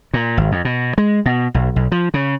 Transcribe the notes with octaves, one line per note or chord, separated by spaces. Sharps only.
A#2
G#1
F2
B2
G#3
B2
B1
B1
F3
C#3